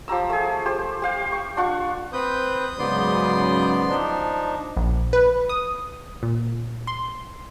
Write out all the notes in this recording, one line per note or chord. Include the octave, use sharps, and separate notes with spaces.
F3 G4 A#5 E6
A3 G#4
G4 C5
G4 F5 G5
C#6
D4 F4 F#5 C#6
C4 B4 D#6 G6
G#2 C#3 F#3 B3 D5 C6
F3 D4 D#4
A#1
B4
D#6
A#2
C6